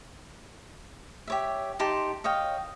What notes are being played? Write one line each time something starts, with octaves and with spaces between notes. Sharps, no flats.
G4 C#5 E5
D#4 G4 A5 C6
C#5 D#5 F5 G5